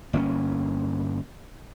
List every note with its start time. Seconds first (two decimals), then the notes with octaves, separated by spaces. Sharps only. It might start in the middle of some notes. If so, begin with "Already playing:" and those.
0.13 G1 A#3 C4 C#4